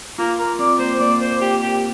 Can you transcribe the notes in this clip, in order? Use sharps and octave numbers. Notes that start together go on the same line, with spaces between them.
A#3 F4
A#4
C4 D5
A#3 C5
A#3 D5
C5
G4
G4